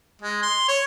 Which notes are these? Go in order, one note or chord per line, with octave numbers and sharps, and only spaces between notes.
G#3
C6
C#5